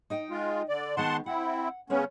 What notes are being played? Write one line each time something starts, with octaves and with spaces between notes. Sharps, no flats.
D#4 D#5 G5
G#3 F4
D3 D5
D#3 G#3 B3 F#5 A5 C6
C4 E4 F#5
C#3 G#3 B3 C#4 G#4 C#5